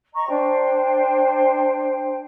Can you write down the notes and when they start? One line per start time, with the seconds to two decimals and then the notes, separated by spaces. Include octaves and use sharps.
0.13 D#5 A#5 C#6
0.28 D4 C5 G5